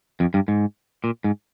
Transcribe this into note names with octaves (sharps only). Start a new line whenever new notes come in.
F2
G2
G#2
A#2
G#2